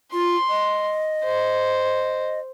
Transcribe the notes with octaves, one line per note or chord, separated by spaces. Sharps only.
F4 C6
D#5
C5